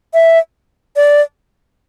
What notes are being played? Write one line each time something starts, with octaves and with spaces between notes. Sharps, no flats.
E5
D5